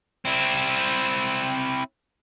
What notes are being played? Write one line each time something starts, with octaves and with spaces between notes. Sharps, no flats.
C4 E4